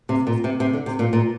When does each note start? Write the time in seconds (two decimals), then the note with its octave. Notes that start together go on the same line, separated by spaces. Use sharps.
0.09 C3
0.27 A#2
0.44 C3
0.60 C3
0.73 D3
0.86 C3
0.99 A#2
1.13 A#2